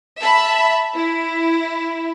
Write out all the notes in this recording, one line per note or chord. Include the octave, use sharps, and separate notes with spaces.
E5 A5 B5
E4